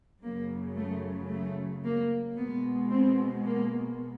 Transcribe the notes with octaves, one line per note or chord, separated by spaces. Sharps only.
F#2 C#3 F#3 A#3
A3
A3
A#3
B2 G#3 B3
C4
A#3